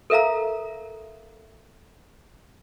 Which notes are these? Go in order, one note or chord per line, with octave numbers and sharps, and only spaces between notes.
A4 A#4 E5 F5 A#5